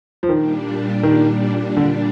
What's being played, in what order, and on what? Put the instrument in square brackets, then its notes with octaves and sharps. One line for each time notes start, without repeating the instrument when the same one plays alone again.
[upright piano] F3
[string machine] A#2 G3 D4 [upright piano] D#3
[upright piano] D#3
D3